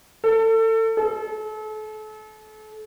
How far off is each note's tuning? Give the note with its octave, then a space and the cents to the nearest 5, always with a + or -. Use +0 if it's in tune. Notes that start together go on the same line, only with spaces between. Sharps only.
A4 +30
A4 -35